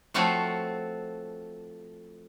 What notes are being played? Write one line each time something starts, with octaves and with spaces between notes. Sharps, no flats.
F3 A3 C4 F4 F#4 C#5